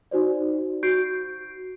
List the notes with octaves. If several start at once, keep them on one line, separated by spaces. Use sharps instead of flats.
D#4 F#4 C5 D5
F#4 C#6 G6 C7 D7